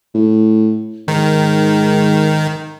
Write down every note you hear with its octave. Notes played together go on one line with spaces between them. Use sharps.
A2
G#2 D#3